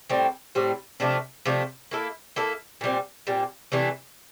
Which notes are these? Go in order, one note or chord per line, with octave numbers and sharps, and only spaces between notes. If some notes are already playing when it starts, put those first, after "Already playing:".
A2 G3 C4
A2 G3 C4
C3 F3 A3 D4
C3 F3 A3 D4
A#3 E4 A4
A#3 E4 A4
A#2 G3 C4
A#2 G3 C4
C3 E3 A3 D4